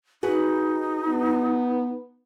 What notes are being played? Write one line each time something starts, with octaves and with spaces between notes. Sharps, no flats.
D#4 F#4 G#4 B4
B3